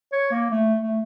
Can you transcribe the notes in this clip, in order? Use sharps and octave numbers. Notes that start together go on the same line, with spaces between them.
C#5
A#3
A3
A3